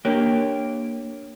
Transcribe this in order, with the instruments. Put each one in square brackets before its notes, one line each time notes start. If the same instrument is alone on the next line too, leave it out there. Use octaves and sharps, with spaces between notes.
[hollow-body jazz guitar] A#3 G4 [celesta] D4 C#5